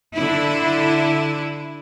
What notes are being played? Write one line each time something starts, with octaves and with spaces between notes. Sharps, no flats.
D3 E4